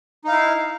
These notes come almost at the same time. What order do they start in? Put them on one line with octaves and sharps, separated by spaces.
D#4 F5 E4